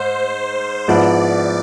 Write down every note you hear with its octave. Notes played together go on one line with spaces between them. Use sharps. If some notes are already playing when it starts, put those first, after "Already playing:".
Already playing: G#2 C5
G#2 F3 B3 E4 D5